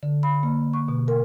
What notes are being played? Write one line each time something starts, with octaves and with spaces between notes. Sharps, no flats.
D3
B5
A#3
C#6
B2
A#4